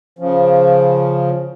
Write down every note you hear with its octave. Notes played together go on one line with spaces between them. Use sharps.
C#3 F3